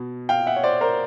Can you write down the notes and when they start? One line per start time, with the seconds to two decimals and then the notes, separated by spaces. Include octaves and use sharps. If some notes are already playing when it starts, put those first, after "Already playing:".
Already playing: B2
0.29 F5 G5
0.47 E5 F#5
0.56 C#5
0.63 C5 D5
0.81 A#4 C5